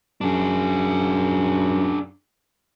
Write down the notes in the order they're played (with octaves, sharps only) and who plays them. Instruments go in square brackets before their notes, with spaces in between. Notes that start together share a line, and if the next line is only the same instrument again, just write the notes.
[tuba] F#2 [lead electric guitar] D4 G#4